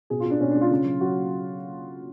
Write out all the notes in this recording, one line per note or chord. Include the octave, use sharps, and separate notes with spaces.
B2 G#4
F4
B2 D4
B2 C#4
D4
G#3
F4
C#3
F#3
F#3 F#4